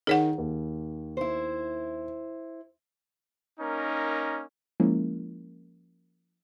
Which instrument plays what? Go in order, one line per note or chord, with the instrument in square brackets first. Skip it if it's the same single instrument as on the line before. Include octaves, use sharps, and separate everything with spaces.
[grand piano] D#3 [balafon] G#4 C#5 F#5
[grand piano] D#2
[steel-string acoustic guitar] E4 C5
[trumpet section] A#3 C#4 D#4 A#4
[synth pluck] F3 G#3 A#3 C#4 E4 A#4